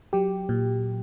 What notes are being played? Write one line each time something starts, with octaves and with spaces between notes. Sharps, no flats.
F#3 G4
A#2